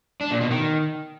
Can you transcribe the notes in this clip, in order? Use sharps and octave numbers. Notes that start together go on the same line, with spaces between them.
D4
A#2
B2
D#3